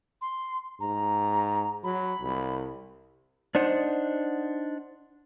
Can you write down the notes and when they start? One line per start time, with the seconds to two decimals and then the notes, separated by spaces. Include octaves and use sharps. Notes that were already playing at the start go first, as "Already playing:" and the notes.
0.21 C6
0.80 G#2 A#5
1.84 F#3 B5
2.21 C2
3.55 D4 D#4 C5 F#5